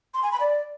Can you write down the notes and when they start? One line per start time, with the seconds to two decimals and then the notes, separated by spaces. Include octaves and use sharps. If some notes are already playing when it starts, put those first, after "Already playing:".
0.14 C6
0.23 G#5
0.31 B5
0.40 D5